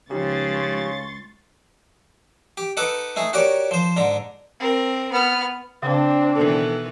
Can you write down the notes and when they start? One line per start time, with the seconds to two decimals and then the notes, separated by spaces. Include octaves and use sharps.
0.11 C#2 C#3 F3 D#4 G4 C6 C#6 A6
2.57 G4
2.77 D#4 A4 B4 F#5 D6
3.16 A3 D#4 G#4
3.33 F#4 G4 A#4 C#5 D5
3.71 F3 C5
3.96 G#2 D3 A#5
4.60 C4 A#4
5.12 B3 F6
5.83 C#3 C4 D4
6.35 B2 D#3 E3 A4